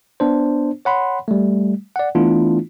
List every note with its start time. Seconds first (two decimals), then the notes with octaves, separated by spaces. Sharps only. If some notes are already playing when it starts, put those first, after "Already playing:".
0.20 B3 D4 C5
0.85 C#5 F#5 B5 C6
1.28 G3 A3
1.96 D5 F#5
2.15 E3 A3 B3 D4 E4 F4